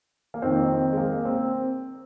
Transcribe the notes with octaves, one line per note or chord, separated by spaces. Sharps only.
A#3
F2 D#3 C4
G#3
A#3
C4